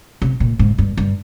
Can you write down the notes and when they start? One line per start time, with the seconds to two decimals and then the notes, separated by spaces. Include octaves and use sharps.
0.22 C3
0.40 A#2
0.59 G#2
0.78 G2
0.97 G2